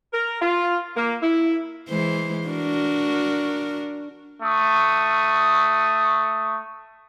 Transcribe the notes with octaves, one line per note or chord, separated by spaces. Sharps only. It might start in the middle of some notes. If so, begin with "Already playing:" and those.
A#4
F4
A#3
E4
E3 G#3 C5
D4 F#4 A#4
A3 C#6 D#6